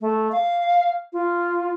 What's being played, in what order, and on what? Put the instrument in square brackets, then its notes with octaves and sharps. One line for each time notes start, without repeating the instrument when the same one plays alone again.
[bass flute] A3
F5
F4